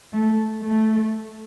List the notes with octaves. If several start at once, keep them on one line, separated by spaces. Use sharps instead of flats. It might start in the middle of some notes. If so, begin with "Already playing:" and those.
A3
A3